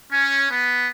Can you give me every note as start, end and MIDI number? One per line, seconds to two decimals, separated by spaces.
0.10 0.47 61
0.50 0.87 59